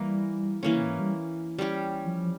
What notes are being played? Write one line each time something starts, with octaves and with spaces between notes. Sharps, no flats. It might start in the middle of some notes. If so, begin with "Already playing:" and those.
Already playing: E3 G3 A#3 A#4
E3 G3 A#3 C#4
C#3
A#2
G#2
G3
G3 C#4 G4
F3